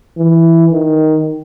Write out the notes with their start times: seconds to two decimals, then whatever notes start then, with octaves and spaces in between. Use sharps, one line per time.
0.18 E3
0.72 D#3